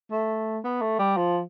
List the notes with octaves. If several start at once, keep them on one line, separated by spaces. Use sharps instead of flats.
A3
B3
A3
G3
F3